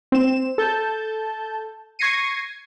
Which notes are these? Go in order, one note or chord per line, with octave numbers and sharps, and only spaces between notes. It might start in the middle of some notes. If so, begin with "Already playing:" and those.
C4 E7
A4 A5 G6
C#6 G#6 A#6 C7 C#7 D#7